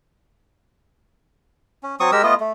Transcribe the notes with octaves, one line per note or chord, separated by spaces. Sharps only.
C#4
F#3 C4 C#6 D#6
G#3 G4 A#4 E6
A3 B3 F4 D#5
A3